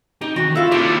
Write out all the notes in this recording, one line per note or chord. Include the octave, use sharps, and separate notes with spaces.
D#4 G4
D#3 E3 F#4
E4 F4 A4 F5
D#2 D3 G4